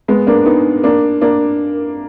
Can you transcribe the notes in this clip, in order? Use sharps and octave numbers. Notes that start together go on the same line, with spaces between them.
G#3 B3
A#3 D4
B3 D#4
A#3 D4
A#3 D4